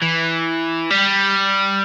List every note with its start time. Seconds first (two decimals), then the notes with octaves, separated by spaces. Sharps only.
0.02 E3
0.90 G3